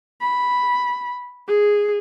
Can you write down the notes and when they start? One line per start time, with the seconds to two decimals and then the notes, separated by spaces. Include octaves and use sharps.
0.21 B5
1.47 G#4